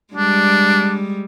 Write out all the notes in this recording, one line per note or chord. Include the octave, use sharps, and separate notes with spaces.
G3 G#3 D4